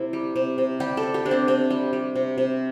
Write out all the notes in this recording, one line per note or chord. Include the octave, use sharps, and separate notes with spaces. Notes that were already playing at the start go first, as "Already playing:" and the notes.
Already playing: C3 E4
G3
C3
C3
G3 G4
A4
G3
G4
C3 D4
C4
C3 C4
G3
G3
C3
C3